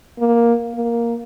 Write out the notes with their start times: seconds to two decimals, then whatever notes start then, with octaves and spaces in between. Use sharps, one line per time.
0.19 A#3
0.75 A#3